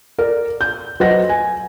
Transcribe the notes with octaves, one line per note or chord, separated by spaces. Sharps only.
A#4 D5
G6
F#3 B4 C5 D#5 F#5 A#6
G#5